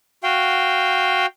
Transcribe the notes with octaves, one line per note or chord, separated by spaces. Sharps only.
F#4 F5 G5